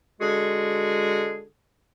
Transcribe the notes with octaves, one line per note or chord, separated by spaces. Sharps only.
D3 G#3 F#4 G#4